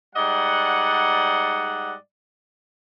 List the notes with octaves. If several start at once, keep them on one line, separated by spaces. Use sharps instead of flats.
G#2 G3 D5 D#5 F#5